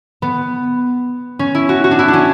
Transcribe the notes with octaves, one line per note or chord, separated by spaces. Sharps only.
B3
C#4
E4
F#4
F#4
D4
E4
D4
C#4